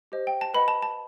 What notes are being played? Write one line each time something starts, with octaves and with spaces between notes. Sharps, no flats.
G4 C5 D#5
G5
A5
B4 D#5 F#5 B5
A5
A5